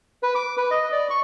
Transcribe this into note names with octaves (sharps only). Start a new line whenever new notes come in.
B4
D6
B4
D#5
D5
C#6